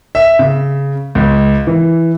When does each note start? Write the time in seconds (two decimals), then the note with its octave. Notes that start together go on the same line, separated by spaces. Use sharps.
0.15 E5
0.39 C#3
1.15 C#2
1.67 E3